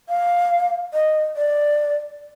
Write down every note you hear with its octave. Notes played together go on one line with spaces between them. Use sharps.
F5
D#5
D5